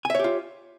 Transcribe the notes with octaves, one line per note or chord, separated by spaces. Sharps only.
F4 G4 C#5 E5 G#5